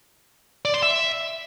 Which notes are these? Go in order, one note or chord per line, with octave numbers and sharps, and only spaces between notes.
D5
C6
E5